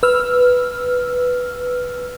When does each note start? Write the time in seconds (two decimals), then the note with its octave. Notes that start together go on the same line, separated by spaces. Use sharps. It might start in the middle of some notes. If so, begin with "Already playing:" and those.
0.03 B4 E6 F6